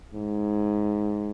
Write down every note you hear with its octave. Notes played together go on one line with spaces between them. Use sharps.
G#2